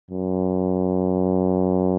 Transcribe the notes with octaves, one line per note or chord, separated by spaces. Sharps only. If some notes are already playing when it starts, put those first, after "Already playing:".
F#2